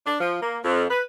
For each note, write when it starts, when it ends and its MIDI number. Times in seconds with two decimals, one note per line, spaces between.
0.07 0.20 62
0.21 0.40 53
0.42 0.59 58
0.64 0.86 41
0.91 1.02 71